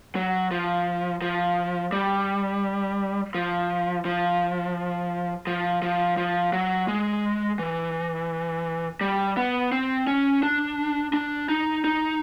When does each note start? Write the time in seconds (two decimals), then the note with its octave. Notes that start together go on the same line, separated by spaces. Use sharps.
0.15 F#3
0.51 F3
1.22 F3
1.92 G3
3.35 F3
4.05 F3
5.47 F3
5.82 F3
6.17 F3
6.53 F#3
6.88 G#3
7.59 E3
9.01 G3
9.37 B3
9.72 C4
10.07 C#4
10.43 D4
11.13 D4
11.49 D#4
11.84 D#4